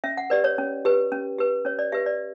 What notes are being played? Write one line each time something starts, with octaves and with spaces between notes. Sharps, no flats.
C#4 E5
F#5
G4 B4 D5
C#5
C#4
G4 B4
C#4
G4 B4
C#4 C#5
D5
G4 B4 E5
D5